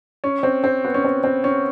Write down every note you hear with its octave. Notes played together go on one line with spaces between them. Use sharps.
C#4
C4
C4
B3
C#4
C4
C4
C#4